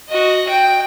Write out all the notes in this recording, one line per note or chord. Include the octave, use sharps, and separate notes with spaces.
F#4 D#5
G5